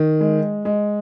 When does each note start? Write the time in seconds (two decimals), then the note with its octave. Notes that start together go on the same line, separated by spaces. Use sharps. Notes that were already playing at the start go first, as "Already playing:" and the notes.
Already playing: D#3
0.21 G#3
0.65 G#3